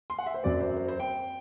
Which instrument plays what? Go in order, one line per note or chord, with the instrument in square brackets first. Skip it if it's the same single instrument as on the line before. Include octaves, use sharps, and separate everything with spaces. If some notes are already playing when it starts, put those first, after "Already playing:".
[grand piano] C6
F#5
E5
C5
F#2 F#3 C4 D5
C5
C5
C5
G5